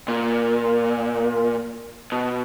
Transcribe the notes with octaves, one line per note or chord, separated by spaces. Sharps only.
A#2
B2